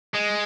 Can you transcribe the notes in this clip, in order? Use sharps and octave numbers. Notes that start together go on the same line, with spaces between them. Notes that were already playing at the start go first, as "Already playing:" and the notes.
G#3